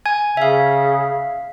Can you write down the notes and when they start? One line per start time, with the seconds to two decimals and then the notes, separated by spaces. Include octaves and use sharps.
0.06 G#5 G#6
0.37 C#3 E5 F5